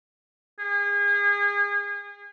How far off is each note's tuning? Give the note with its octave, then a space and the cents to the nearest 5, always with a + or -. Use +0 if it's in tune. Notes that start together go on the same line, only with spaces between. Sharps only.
G#4 -35